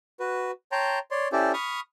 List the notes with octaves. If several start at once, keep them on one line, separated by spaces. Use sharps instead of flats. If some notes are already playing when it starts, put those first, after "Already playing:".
F#4 B4
C#5 G5 A5 A#5 C6
C#5 D5 C6
C#4 E4 G4 A4 C5 D5
B5 C#6 D#6 F6